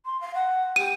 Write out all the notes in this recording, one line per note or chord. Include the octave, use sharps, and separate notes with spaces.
C6
F5
F#5
G4 D#7